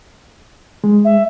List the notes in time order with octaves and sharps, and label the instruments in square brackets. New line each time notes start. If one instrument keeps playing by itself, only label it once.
[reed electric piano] G#3
[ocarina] E5